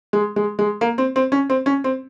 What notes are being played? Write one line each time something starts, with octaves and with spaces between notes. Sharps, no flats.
G#3
G#3
G#3
A#3
C4
C4
C#4
C4
C#4
C4